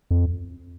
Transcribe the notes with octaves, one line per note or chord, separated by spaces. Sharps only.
F2